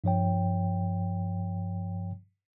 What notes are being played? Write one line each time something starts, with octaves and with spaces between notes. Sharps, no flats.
G2 F3 C#5 G5